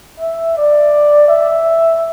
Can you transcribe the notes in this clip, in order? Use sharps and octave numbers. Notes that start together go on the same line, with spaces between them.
E5
D5
E5